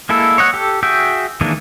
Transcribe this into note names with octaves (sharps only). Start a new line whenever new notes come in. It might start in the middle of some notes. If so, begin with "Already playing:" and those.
G#3 A#3 E4 A4
C#5 D#5 F#5
G4 A4
F#4 G#4 E5 G5
D#3 E3 G#3 A#3 D4